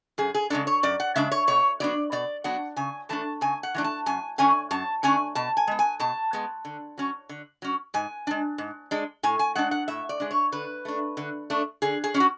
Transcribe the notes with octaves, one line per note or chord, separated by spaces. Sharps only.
F#2 G#4
G#4
C#3 G#3 D4 A4
C#5
F#2 D5
F#5
C#3 G#3 D4 E5
C#5
B2 C#5
F#3 B3 D4 D5
B2 D5
F#3 B3 D4 F#5
C#3 G#5
E3 A3 D4 A5
C#3 G#5
F#5
E3 A3 D4
A5
F#2 G#5
D3 A3 C#4 G#5
F#2 A5
D3 A3 C#4 G#5
B2 A5
G#5
G#3 B3
G#5
B2 A5
G#3 B3
D3
F#3 C#4
D3
F#3 C#4
G#2 G#5
G#3 D4
G#2
G#3 D4
A2 G#5
G#5
G#3 D4 F#5
F#5
A2 E5
D5
G#3 D4
C#5
D3 B4
A3 D4
D3
A3 D4
D3 G#4
G#4
F#3 C#4
F#4